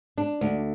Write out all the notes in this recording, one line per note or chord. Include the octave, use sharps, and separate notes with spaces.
D4
D2